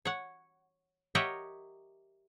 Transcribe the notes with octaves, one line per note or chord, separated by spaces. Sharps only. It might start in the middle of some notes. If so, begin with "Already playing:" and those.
C#5 F#5
G4 A#4 C#5 D#5 E5 F#5